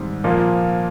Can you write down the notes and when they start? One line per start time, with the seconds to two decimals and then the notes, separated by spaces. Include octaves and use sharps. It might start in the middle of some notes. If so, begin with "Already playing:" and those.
Already playing: G#2 D#3 G3 C4
0.24 A#2 F3 A#3